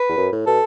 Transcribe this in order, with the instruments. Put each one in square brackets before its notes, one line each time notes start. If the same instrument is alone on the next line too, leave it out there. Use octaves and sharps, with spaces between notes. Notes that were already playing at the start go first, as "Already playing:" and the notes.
Already playing: [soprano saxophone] B4
[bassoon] E2
F#2
A2
[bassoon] B2 [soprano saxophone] A4